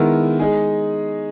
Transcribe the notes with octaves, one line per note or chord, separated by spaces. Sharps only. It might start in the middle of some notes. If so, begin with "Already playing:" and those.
Already playing: D#3 G#3 B3 E4 A#4
G#3 D#4 G#4